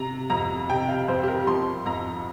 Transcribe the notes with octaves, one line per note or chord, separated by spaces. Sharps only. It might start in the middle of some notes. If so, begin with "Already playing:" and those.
Already playing: C3 A#5
F2 A#5
C3 G5
F5
F2 C5
G4
A#4
F3 C6
F2 A#5